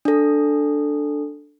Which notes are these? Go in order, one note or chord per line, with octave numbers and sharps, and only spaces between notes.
D4 A4